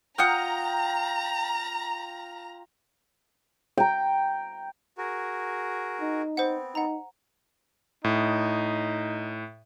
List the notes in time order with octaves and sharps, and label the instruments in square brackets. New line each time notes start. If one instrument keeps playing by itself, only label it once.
[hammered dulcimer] F4 G5 [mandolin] F#5 D#6 F6 [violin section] A#5
[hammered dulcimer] G5 A#5
[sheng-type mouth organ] F#4 G#4 A#4
[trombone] D#4
[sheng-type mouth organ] B3 C4 [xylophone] C5 F#5
[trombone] D#4 [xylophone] F#5 A#5
[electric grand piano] A2 [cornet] D#4